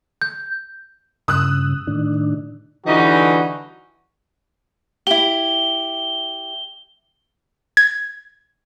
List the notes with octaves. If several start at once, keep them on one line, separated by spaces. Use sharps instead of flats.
G6
G2 C#3 D#6 E6 F#6
A2 D#3 D4
D3 E3 G3 D#4 F#4
E4 G4 G7
G#6